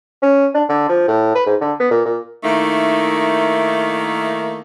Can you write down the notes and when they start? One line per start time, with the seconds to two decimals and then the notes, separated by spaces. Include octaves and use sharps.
0.23 C#4
0.55 D4
0.69 D3
0.89 F3
1.08 A2
1.35 B4
1.46 G#2
1.61 D3
1.80 B3
1.91 A#2
2.06 A#2
2.43 D#3 A3 A#3 D#4 E4